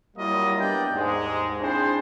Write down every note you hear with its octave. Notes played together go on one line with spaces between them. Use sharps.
F#3 G3 A#3 E4 F4 D#5
A#3 B3 D4 G4 D5 G5
D#2 G#2 G#3
C4 D4 E4 G#4 C5